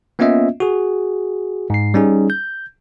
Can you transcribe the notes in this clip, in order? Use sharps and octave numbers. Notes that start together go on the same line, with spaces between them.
A#3 B3 C#4 F4 D#5 E5
F#4 G#4
G#2 C7
G3 C#4 D#4 G#4
G6